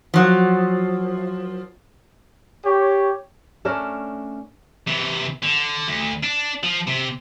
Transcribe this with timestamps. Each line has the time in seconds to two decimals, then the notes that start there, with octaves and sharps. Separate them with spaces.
0.14 F3 F#3
2.65 G4 C#5
3.65 A3 C#4 D4 A#4
4.88 C3 E3
5.43 D3
5.88 D2
6.23 D4
6.63 F3
6.87 C3